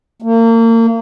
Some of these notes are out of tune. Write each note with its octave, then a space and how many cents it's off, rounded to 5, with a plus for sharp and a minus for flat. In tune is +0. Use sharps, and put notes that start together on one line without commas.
A#3 -35